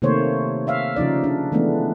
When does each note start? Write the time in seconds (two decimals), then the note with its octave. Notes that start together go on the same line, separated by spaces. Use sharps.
0.02 C3 D#3 A3 A#3 C5 C#5
0.67 C#5 E5 F5
0.96 C#3 F3 D#4 D5
1.24 D4
1.52 E3 G#3 A3 B3 D4